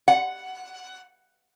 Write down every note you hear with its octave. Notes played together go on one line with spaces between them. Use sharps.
F#5